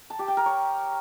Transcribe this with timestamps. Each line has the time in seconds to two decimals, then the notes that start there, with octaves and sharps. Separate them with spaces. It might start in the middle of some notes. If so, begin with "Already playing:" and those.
0.10 A5
0.19 G4
0.28 G5
0.37 A#4
0.46 C#5